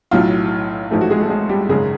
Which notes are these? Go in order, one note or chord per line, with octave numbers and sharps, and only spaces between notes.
B1 A2 F#3 F4
A1 G#2 F3 A3
F#4
G#3 G#4
A3 A4
G#3 G#4
G3 G4
G#1 F#2 C#3 G#3 G#4